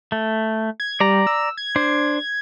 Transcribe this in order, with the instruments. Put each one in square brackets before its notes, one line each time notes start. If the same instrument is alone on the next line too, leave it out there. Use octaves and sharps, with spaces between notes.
[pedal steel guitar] A3
[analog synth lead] G#6
[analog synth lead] G3 [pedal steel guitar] D5 A#5
[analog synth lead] E6
G#6
[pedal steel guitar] D4 C5